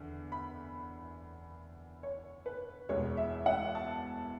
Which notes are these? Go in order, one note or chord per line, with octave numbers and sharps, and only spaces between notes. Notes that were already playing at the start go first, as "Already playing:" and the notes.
Already playing: E2 D3
B5
C#5
B4
E1 E2 B2 G#3 C#5
E5
F#5
A5